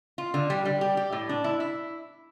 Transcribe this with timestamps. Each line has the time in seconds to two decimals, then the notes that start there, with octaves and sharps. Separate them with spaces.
0.18 F4
0.34 D3
0.50 G3
0.65 G3
0.81 G4
0.97 G4
1.12 A2
1.29 D4
1.44 E4
1.60 E4